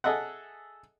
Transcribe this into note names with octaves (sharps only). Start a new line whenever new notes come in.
G#4 A4 D#5 E5 F#5